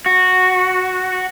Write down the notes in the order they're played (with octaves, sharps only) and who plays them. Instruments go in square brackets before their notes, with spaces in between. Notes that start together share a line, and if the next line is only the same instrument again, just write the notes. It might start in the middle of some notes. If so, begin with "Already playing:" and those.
[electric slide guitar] F#4